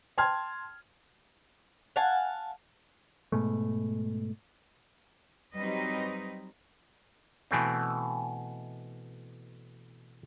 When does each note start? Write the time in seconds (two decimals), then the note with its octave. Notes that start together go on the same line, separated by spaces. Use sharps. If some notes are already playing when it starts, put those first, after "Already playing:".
0.18 G5 A5 C6 F6 G#6
1.96 F5 F#5 G#5 A5
3.32 G#2 B2 G#3 A3
5.56 F#3 G3 C4 D#4 B4 D#5
7.51 B2 E3 A3 C4